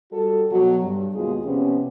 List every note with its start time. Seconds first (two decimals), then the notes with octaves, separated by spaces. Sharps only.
0.11 G3 F#4 A4
0.50 B2 F#3
0.82 G2
1.14 D#2 B2 G#3 F4 G#4
1.44 C3 F3 B3 C#4